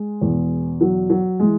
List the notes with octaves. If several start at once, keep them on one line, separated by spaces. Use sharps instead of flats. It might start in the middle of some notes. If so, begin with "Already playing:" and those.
Already playing: G#3
E2 B2
F#3
F#3
E3 G#3